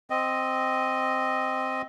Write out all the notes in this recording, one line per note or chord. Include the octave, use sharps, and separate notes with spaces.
C4 D#5